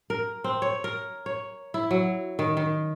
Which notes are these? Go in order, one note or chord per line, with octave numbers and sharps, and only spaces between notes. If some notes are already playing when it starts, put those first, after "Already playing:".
A#4
C4
C#5
A#4
C#5
E4
F#3
D#3
D#3